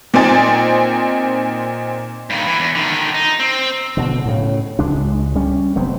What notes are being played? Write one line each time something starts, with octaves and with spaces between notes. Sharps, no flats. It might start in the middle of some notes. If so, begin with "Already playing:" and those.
A#2 C4 D#4 G#5 A6
G2 D#3
E3
E2
D3 D#3
D#4
C4
B2 D3
A2 C#3
C#2 G#3 D4
G3 C#4
F1 F#3 B3 C4